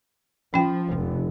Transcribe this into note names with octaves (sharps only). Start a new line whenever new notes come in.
F3 C#4 G5
F1